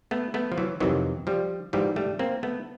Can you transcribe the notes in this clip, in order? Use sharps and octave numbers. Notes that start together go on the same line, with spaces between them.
A3 B3
A3 B3
F3
E3 F#3
F2 C3 D#3 E3 F#3
F3 G3
G#2 E3 F3 G3
G3 A3
A#3 C4
A3 B3